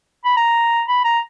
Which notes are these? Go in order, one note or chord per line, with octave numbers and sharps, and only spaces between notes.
B5
A#5
B5
A#5